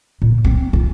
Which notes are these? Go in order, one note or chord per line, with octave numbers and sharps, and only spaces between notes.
A#2
C4
F4